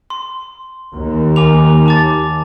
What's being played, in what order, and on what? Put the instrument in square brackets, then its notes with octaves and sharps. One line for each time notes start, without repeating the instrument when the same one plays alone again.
[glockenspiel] C6
[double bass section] D#2
[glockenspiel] G#5 D6 F7
A5 D6 A6